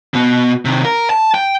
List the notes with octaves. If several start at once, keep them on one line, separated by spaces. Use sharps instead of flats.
B2 B3
C3 D#3
A#4
A5
G5